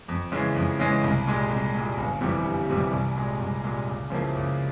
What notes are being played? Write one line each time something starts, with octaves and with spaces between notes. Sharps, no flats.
F2
C#3 E3 G#3
F2
C#3 E3 G#3
C2
A#2 G#3
C2
A#2 G#3
G1
F2 C3 E3 G3
G1
F2 C3 E3 G3
C2
A#2 G#3
C2
A#2 G#3
C#2
C#3 F3 A#3 E4
C#2